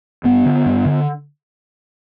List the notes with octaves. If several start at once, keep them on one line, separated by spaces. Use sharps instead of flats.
G2 B3
D3
G2
D3